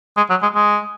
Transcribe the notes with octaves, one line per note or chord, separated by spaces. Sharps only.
G#3
F#3
G#3
G#3